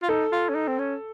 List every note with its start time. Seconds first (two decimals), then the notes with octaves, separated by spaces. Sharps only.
0.02 F4
0.09 D#4 A4
0.32 F4
0.49 C#4
0.55 D#4
0.67 C4
0.78 C#4